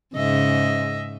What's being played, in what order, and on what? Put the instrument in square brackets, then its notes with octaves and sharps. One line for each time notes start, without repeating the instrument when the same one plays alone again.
[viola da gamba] G#2 C#3 [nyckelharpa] D#5 E5